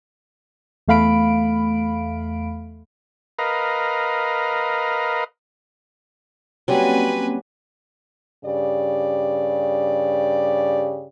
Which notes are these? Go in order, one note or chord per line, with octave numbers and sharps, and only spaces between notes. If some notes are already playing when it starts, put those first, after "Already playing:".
E2 A3 F5 B5 D7
A#4 B4 D#5 F5
F#3 G3 A#3 C4 C#4 G4 B4 G#5
G2 C#3 G4 D5